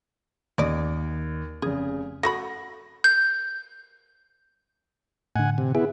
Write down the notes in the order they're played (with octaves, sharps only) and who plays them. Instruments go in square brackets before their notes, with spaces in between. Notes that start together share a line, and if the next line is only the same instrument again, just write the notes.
[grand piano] D#2 [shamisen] C#4 D5 D#5
[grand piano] F1 C#3 [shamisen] G#4
[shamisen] A3 F#4 B5 [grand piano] A#6
[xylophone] G6
[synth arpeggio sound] A2 D3 [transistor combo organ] F#5 G#5
[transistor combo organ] C3
[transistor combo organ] B3 E4 [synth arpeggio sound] G#4